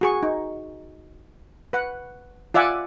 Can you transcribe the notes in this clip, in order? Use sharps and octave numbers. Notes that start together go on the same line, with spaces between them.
F#4 G#4 C#6
D#4
B4 F#5
F4 D5 E5 F#5 G#5 D6